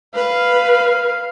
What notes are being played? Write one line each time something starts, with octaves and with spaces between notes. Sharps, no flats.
B4 F5